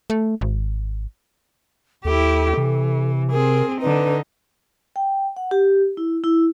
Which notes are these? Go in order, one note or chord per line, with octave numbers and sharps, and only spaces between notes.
A3
G#1
D#2 E4 G4 A4
C3 E3
C4 G#4 A#4
D3 D#4 B4
G5
F#5
G4
E4
E4